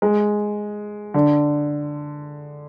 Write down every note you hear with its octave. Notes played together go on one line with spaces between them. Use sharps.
G#3
D3